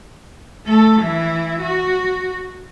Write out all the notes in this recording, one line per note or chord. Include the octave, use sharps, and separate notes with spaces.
A3 A4
E3 E4
F#4